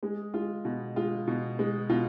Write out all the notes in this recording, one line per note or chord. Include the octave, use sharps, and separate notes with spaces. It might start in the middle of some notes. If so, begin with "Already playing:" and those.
G#3 G#4
G#3 F4
B2
G#3 F4
B2
G#3
B2 F4